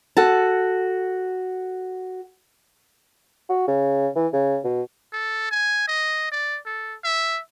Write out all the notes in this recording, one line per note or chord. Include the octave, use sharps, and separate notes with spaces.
F#4 A4 A5
F#4
C#3
E3
C#3
B2
A4
G#5
D#5
D5
A4
E5